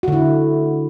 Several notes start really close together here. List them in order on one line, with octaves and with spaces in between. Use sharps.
F#4 D3 E4